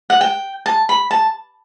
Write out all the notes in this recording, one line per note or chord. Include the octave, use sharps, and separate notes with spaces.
F#5
G5
A5
B5
A5